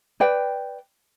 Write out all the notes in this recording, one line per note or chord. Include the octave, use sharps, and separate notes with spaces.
B4 D5 G5